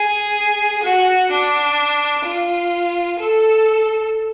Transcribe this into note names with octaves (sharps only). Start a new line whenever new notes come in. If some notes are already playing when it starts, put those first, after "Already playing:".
Already playing: G#4
F#4
D4
F4
A4